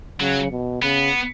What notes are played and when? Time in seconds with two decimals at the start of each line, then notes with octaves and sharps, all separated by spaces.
0.20 C#3 F#3
0.51 B2
0.82 C#3 B3